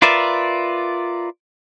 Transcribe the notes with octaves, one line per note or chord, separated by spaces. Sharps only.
F4 A#4 B4 D5 E5